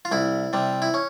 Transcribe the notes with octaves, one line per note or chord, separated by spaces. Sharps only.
F4
C2 E4
C3 G3
E4
C#4